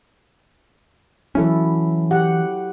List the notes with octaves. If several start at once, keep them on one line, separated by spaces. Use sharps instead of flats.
E3 F#3 C#4 E4 A4
G4 F#5